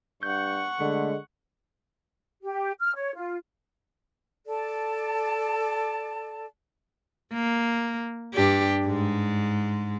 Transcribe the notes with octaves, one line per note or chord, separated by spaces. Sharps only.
G2 F#5 C#6 G6
D3 G#3 A3
G4
F6
C#5
F4
A4 D5 A5
A#3
G2 D4 G4
G#2 G#3